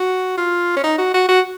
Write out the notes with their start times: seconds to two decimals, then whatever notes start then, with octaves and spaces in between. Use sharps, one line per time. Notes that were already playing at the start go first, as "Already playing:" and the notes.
Already playing: F#4
0.38 F4
0.77 C#4
0.84 D#4
0.98 F#4
1.14 F#4
1.28 F#4